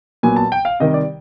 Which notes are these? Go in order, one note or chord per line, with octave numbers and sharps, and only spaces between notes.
A#2 F#3 B3 G#5
A5
G5
F5
C3 D#3 G3 D#5
D5